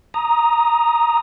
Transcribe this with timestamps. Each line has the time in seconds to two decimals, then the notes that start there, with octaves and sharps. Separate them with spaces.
0.14 A#5 D#6